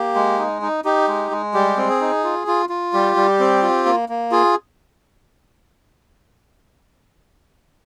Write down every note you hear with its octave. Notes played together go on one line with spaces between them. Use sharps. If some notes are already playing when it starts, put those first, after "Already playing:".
Already playing: A#3 G4
G#3
D#4
D#4
D#4 G4
G#3
G#3
G3 G4
C4
G#4
D#4
F4
F4
F4
G3 G4
G3
C4
F4
A#3
A#3
F4 G#4